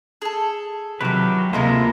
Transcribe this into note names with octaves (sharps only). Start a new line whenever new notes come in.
G#4 A4
C3 D#3 F3 F#3 F#4 G4 B4
D2 C3 F3 G#3 A#3 E4 F4 A4